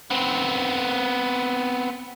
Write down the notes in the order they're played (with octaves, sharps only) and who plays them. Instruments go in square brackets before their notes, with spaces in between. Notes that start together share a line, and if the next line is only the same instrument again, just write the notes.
[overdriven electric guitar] B3 C4